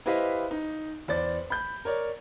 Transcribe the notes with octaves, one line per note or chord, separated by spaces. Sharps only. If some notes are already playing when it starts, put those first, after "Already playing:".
E4 G4 B4 C5 D#5 F5
D#4
E2 C5 D5 A6
B5 G6
A#4 C#5 D5